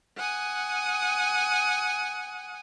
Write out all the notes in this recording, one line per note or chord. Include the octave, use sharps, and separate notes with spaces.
F#5 G#5 D#6